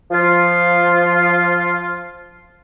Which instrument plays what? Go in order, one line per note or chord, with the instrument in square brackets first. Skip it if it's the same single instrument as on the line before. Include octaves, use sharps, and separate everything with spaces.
[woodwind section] F3 F4